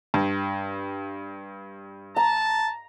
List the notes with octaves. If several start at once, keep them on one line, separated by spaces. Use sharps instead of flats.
G2
A5 A#5